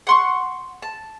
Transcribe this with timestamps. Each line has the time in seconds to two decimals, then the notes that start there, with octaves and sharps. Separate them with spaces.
0.07 F#5 C6 C#6
0.82 A5